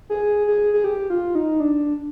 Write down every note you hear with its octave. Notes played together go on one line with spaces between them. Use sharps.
G#4
G#4
G#4
G4
F4
D#4
D4